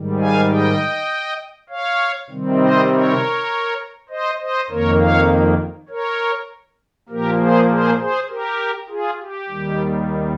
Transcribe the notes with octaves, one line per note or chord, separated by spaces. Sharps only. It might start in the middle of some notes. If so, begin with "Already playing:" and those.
Already playing: G#2 D#3 G3
F5 G#5
D#5 G5
C#5 F5
C3 D#3 G3 C4
C5 D#5
A#4 C#5
C5 D#5
C5 D#5
F2 D#3 A#3 A#4 C#5
C#5 F5
A#4 C#5
A#2 F3 A#3 G4 A#4
G#4 C5
G#4 C5
G#4 C5
G4 A#4
F4 G#4
G4
D#2 D#3 G3